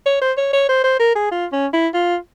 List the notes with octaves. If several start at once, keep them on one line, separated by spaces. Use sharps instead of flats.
C#5
C5
C#5
C#5
C5
C5
A#4
G#4
F4
C#4
E4
F4